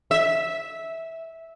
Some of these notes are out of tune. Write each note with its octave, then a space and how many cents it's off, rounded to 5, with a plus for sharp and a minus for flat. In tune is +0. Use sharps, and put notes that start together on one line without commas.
E5 -10